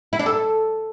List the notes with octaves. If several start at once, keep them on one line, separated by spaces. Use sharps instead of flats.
E4
D4
A4